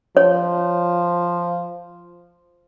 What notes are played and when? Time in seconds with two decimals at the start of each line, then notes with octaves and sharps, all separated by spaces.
0.17 F3 C#5